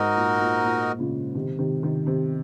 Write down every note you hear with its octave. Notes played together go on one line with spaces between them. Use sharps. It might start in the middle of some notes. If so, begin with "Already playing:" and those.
Already playing: G#2 D#4 F#4 A#4 D#5
A#2
A#2
A#2
A#2 C#3
C3 D#3
C3 D#3
C3 D#3
C3 D#3